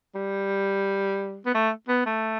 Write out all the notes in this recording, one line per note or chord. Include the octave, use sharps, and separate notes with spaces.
G3
B3
A3
B3
A3